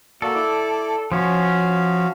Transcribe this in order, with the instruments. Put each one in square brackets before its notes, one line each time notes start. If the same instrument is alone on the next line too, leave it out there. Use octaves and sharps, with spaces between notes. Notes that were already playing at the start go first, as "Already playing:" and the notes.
[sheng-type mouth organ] A#3 F#4 D5 [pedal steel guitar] A4
[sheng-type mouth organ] E4 D5 D6
[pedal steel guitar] F3 C#4 [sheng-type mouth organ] F#4 F5